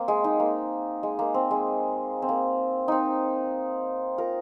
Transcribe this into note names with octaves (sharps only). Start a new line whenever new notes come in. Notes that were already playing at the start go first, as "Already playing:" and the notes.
Already playing: A#3 C4
G#3
D#4
A#3
G#3
A#3
C4
G#3
C4
A#3
C4 D#4
F4 A#4